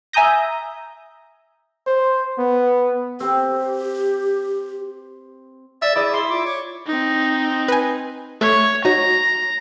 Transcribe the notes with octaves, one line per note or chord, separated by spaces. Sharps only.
E5 G#5 A#5 D#6 G6 A#6
C5
B3
C4 G4
D5 E5 E6 A6
E4 G#4 D5 D#5 D6
E5 C6
F4 D6
C#5
C4 D#4
B4 G#5
A3 C#5 E5
D#4 F#4 C#5 A#5